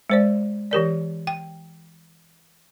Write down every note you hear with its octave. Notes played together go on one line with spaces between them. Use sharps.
G#3 C5 D5
E3 G4 A#4 D5
G5